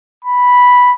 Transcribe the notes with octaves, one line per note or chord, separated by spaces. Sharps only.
B5